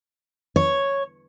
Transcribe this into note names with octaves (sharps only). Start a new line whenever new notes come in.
C#5